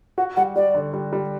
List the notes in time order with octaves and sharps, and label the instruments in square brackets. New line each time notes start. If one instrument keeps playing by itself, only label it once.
[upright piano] F#4 [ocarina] F#5
[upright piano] G3 [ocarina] F#5
[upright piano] G3 [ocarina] D5
[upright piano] D3
G3
G3